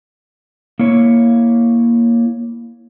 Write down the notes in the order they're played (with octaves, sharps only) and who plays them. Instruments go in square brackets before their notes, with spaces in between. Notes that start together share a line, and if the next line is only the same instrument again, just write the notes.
[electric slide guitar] A#3 E4 C#5